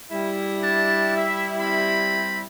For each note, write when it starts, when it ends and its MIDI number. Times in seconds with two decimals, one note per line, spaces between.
0.11 2.43 55
0.11 2.43 64
0.63 1.13 62
0.63 1.13 81
1.17 1.49 76
1.61 2.43 60
1.61 2.43 83